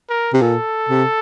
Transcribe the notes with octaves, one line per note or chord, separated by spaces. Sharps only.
A#4
C3
A#2 A4
C3